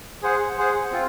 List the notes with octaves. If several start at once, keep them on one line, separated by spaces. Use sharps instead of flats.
G#4 C5 F#5
G#4 C5 F#5
C4 F4